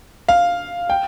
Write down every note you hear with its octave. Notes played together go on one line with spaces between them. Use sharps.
F5
G5